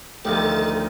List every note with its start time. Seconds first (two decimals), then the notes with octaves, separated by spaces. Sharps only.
0.25 D2 D#3 F3 G4 A4 D#5 F5